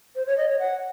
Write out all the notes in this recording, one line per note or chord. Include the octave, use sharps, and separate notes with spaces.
C5
C#5
D#5
C#5
F#5